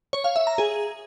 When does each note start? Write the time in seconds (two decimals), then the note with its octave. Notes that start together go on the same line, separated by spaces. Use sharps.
0.13 C#5
0.24 F5
0.36 E5
0.47 A#5
0.58 G#4